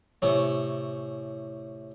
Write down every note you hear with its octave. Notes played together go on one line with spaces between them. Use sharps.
A2 C3 C#4